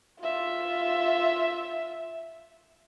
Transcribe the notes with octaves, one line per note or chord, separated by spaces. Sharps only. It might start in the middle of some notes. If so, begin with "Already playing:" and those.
F4 E5